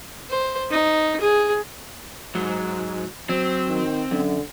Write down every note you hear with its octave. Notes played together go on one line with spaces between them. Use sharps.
C5
D#4
G#4
G#2 F#3
F#3 C4
D#3
F#2 D3